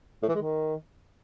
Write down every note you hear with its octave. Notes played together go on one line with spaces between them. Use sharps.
A2
E3
G#3
D#3